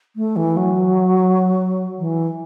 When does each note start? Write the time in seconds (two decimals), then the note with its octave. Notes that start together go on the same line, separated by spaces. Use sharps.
0.16 A3
0.36 E3
0.57 F#3
1.99 E3